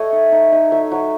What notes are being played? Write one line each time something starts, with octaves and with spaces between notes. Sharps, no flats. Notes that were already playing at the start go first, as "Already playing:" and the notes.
Already playing: A3 A4 C#5 D#5
D#4
D#4
D#4
F#3 E5
F#3